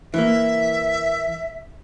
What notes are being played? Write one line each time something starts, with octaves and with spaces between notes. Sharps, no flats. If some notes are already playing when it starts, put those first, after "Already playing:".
E3 A#3 E5